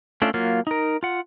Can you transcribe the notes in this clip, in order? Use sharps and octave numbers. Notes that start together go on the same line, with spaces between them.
A3 C#4 D4 F4
F#3 A#3 F4
D#4 A#4
F4 F#5